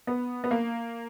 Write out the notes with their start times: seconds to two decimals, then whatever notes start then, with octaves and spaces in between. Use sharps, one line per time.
0.07 B3
0.44 B3
0.51 A#3